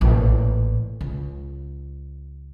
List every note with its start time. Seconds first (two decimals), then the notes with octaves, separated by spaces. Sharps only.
0.01 A1 A#2
1.01 C#2